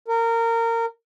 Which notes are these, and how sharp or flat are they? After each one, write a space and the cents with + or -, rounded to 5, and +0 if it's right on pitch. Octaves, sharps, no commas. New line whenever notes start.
A#4 -20